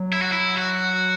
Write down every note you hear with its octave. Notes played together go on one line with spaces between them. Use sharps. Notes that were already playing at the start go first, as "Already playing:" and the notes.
Already playing: F#3
E4
F#4
E4
F#4